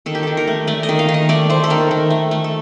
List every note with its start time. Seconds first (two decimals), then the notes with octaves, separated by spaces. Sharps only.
0.06 D#3 A4
0.15 G4
0.23 D#3 A4
0.37 A#4
0.47 A3
0.67 A3 D5
0.83 D#5
0.89 D#3
0.99 F5
1.09 D#3
1.14 D#5
1.29 A3 D5
1.50 A3 C5
1.64 A4
1.70 D#3 A#4
1.91 D#3
2.10 A3
2.31 A3
2.44 A4